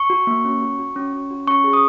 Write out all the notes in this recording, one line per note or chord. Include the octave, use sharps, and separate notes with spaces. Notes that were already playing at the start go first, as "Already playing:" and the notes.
Already playing: C#6
F#4
A#3
C#4
F#4
F#4
C#4
C#4
F#4
C#4 C#6
G#4
D#6